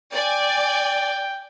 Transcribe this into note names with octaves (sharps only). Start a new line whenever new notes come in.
D5 G5 G#5